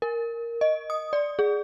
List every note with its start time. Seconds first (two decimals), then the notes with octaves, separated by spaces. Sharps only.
0.02 A#4
0.61 D#5
0.90 D#6
1.13 D5
1.39 G#4